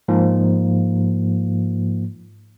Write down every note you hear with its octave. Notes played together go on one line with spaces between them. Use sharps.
G#2 F3 A#3